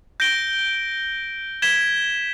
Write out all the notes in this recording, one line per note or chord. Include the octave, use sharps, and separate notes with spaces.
G6 A#6 D7 G7
G#6 B6 E7 G7